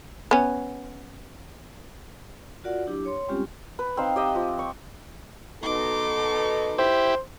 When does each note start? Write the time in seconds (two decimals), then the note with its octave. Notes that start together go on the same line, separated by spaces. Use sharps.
0.31 B3 C#4
2.64 F4 F#4 A#4 D5 F#5
2.86 F#3 D4 E4 G4 D6
3.05 C#5 C6
3.28 G3 G#3 C4 C#4 F4 G4
3.79 B4
3.97 C4 D#4 F5
4.16 G4 D#5 E5
4.35 F3
4.59 C#6
5.63 B2 D#4 A4 C6 D6
6.78 E4 G4 C5